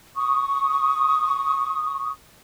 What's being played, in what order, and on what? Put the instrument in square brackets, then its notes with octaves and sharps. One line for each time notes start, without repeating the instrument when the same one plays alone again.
[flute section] C#6 D#6